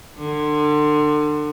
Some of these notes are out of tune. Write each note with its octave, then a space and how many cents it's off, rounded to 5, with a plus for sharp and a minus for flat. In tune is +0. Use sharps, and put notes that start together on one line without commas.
D3 +30